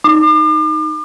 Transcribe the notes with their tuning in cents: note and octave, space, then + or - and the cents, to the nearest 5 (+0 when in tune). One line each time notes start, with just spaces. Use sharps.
D#4 +0 D6 +40